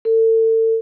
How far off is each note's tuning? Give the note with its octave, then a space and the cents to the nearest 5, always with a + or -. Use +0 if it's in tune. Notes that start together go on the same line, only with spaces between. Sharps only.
A4 +35